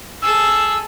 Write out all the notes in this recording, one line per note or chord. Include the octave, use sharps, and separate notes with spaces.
G#4 A4 E6